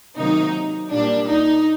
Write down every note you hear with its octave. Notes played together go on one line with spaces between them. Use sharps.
C3 D#3 F#3 A#3 D#4
A#2 G3 A#3 D4
D#4